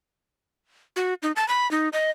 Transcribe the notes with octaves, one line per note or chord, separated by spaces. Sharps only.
F#4
D#4
A5
B5
D#4
D#5